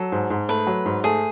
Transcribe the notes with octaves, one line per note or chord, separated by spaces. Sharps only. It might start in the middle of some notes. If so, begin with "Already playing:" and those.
Already playing: F#3 A4
G#2
G#2
A3 B4
F#3
G#2
A3 G#4